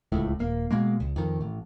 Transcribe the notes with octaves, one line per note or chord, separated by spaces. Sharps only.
D1 C#2 A2
D#1 A#3
B2 G#3 A#3
C#2
F2 D#3
A1